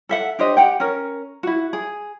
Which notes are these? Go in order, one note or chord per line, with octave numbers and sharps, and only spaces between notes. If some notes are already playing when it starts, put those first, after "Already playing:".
A4 E5 F#5
D4 G4 C5 D#5
G4 F#5 G5
C#4 A#4
E4 F#4
G#4